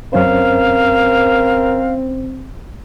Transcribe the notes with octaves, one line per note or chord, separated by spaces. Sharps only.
F#2 C4 C#4 A#4 C5 F5